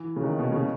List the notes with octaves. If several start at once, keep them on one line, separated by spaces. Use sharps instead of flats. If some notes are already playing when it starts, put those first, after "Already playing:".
Already playing: E3
C#3
D#3
B2
C#3